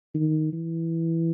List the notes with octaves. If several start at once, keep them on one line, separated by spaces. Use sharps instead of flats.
D#3
E3